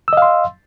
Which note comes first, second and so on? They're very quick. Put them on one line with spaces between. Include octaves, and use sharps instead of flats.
E6 D#5 F5 C6